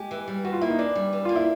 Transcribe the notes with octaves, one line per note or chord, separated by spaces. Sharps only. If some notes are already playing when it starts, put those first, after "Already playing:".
Already playing: G#3 G4
E3
G3
E3 F#4
F4
A#3 E4
D#4
E3 D4
G3
E3
A#3 F4
E4